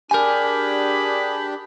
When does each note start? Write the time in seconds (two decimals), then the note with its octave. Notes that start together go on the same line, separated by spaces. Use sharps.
0.11 D4 G4 G#4 A#4 G#5 B5